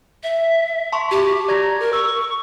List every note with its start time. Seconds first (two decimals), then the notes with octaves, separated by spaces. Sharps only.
0.23 E5
0.92 A5 C6 C#6
1.11 F#4 G4 C#6
1.48 D5 A#5 G#6 A#6
1.80 A#4
1.93 C#6 E6